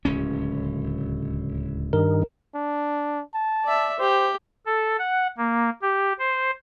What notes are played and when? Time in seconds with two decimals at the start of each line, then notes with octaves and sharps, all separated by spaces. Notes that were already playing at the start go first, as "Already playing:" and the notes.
0.05 D1 C#2 C#4
1.93 G2 D#3 A#4
2.55 D4
3.34 A5
3.64 D5 E5
3.99 G4 C5
4.66 A4
4.99 F#5
5.38 A#3
5.82 G4
6.19 C5